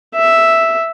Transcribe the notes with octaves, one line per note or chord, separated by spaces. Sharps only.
E5